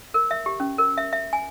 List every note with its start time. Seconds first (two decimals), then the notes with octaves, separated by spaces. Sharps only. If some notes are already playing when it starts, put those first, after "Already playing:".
0.14 A#4
0.31 E5
0.46 G4
0.60 C#4
0.78 A#4
0.97 E5
1.13 E5
1.33 G#5